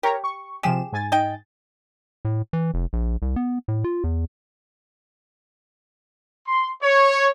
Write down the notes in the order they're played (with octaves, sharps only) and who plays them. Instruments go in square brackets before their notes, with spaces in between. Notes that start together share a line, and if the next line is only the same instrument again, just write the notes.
[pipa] G4 [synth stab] A#4 C#5 A#5
[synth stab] C#6
[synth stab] C3 F3 E7 [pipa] G4 G#4
[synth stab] G#2 G#5 A6
[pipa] D#4 D#5 G5
[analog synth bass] A2
E3
F1
A#1
C2
B3
A2
F4
E2
[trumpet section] C6
C#5